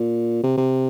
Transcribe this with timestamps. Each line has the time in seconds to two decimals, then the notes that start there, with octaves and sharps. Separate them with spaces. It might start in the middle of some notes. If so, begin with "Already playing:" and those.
Already playing: A#2
0.43 C3
0.58 C3